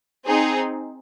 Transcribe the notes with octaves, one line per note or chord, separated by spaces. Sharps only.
C4 D#4 G#4